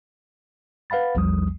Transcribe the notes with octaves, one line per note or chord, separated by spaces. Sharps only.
B4 F5 F#5 B5 A6
A#1 E2 F3 G3 D#6